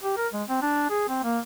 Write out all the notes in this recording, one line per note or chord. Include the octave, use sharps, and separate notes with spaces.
G4
A#4
G#3
C4
D4
G#4
C4
A#3